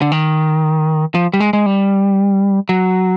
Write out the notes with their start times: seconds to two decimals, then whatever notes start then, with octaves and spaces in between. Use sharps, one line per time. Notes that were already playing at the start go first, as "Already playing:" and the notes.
0.02 D3
0.12 D#3
1.15 F3
1.34 G3
1.40 G#3
1.53 G#3
1.66 G3
2.69 F#3